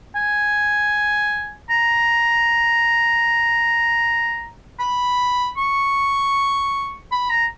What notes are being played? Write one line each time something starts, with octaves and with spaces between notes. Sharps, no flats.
G#5
A#5
B5
C#6
B5
A#5